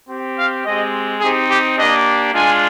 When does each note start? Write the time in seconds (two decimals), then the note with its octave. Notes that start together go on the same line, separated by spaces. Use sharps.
0.09 C4 G4
0.38 F5
0.66 G#3 C4 G4 D#5
1.21 C4 D#4 G4 G#4
1.50 G4
1.78 A#3 D4 G4 D#5
2.33 G#3 D4 F4 G#5